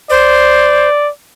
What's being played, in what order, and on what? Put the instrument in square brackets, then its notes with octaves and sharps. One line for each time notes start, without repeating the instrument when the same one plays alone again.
[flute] C5 [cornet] D5